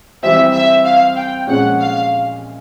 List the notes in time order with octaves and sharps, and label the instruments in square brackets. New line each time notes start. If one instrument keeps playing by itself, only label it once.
[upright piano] E3 G3 C4 [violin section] E5
[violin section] E5
F5
G5
[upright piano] A#2 F3 G#3 C#4 [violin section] F#5
[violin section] F5